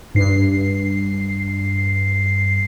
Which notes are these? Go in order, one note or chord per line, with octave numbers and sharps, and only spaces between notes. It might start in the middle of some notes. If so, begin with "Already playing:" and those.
G2 C7